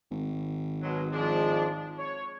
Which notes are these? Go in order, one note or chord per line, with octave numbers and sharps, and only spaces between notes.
G#1
B2 F#3 G#3
F3 G#3 D4
C#5